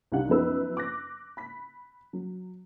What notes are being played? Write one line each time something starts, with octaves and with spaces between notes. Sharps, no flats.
C2 D4 D#4 G4 F5 F#5
F#2 F3 B3 D#4 B4 E6
D6 F#6 A#6
B5 B6
F#3